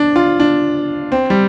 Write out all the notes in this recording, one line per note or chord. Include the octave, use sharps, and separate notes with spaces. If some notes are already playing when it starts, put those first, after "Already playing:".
Already playing: D4
F4
D4
C4
G3